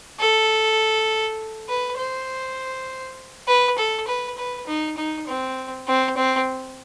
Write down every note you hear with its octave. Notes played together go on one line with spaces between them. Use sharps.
A4
B4
C5
B4
A4
B4
B4
D#4
D#4
C4
C4
C4